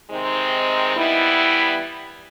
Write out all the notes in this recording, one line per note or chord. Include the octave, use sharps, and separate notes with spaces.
C3 D#3 G#3 C4 D#4
E3 G3 B3 E4